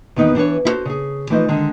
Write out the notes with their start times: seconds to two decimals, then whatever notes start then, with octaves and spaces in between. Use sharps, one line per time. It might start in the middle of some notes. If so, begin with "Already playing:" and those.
0.16 E2 D#3 B3 D#4
0.35 E3 D4 A4 B4 C#5
0.65 E4 F#4 A4 C5
0.85 C#3 G#4
1.30 E3 F3 A3 D#4 C5 D#5
1.48 D3 D#3 G#3